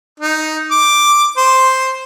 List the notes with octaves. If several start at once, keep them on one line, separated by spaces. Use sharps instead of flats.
D#4
D6
C5